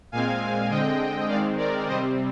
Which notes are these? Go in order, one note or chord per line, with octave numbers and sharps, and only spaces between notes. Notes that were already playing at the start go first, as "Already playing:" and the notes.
A#2 G#3 C4 F5 G#5
D3 G#3 C4 D#5 G5
D#3 G#3 C4 D5 F5
A#4 D5
C3 G3 C4 C5 D#5